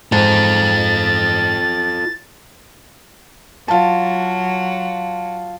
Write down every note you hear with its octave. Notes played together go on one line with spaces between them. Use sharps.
G#2 F4 A4 A6
F#3 F4 A5